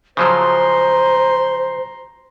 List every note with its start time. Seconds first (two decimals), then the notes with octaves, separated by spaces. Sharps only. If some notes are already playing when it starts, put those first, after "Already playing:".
0.17 C#3 F3 F#3 C5 A#5 C6